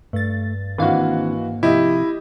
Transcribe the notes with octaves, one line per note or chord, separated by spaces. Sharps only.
G2 A3 A6
G#2 D#3 E3 A#3 C4 D4 F#4 F5
C3 F3 E4 G4 D#5 E5